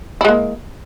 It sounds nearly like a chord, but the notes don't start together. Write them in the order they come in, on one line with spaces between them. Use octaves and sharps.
E4 G#3 A#3